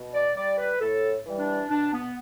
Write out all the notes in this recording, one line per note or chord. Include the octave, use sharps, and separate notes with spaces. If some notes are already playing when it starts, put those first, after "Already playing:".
Already playing: B2
D5
G3 D5
B4
A2 A4
E3 G3
D4
B2 D4
B3